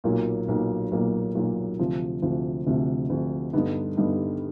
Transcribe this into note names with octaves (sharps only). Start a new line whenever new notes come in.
B1 A#2 F#3 A#3
B1 A#2 F#3 A#3
B1 A#2 F#3 A#3
B1 A#2 F#3 A#3
D2 C3 F3
D2 C3 F3
D2 C3 F3
D2 C3 F3
G2 D3 G3 B3 D#4
G2 D3 G3 B3 D#4